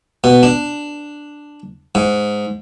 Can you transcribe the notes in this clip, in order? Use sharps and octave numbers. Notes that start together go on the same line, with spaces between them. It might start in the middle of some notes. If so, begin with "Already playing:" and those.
B2
D4
G#2